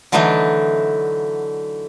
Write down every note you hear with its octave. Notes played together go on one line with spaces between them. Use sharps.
D3 E3 F#3 A3 D4 D#4